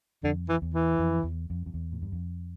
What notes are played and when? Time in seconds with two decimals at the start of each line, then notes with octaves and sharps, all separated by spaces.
0.23 F2 D3
0.49 E3
0.62 E2
0.74 E3
0.99 F2
1.24 E2
1.50 F2
1.66 F2
1.74 E2
1.92 A2
2.02 G2
2.12 F2